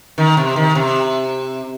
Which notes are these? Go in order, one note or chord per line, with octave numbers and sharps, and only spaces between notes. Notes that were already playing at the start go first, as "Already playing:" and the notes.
D#3
C3
D#3
C3